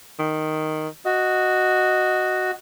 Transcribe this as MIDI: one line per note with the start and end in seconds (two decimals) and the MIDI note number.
0.19 0.88 51
1.05 2.51 66
1.05 2.52 75